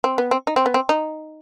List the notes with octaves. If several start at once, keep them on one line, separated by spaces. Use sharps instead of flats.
C4
B3
C4
D#4
C4
B3
C4
D#4